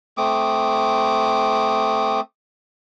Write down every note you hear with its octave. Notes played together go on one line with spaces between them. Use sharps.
A3 C4 D6 D#6